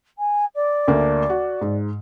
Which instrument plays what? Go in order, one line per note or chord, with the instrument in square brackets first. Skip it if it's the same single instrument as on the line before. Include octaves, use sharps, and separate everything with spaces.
[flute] G#5
D5
[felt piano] D2 A3 A#3
F#4
G#2